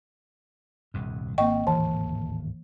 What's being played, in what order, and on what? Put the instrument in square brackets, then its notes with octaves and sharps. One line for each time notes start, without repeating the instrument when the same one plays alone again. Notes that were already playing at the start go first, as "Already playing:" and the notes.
[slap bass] D#1 C2 G2
[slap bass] G#1 C4 [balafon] A#3 C#6 [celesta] D#5 G5
[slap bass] D1 G#1 D#2 [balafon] E3 [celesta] A5